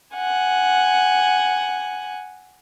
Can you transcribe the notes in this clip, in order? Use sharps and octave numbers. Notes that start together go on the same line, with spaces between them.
F#5 G#5